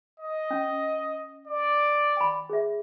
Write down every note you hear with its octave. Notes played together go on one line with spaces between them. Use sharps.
D#5
C#4
D5
G5 B5
G#4 E5